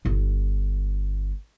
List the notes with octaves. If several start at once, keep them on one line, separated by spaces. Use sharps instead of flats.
G1 E4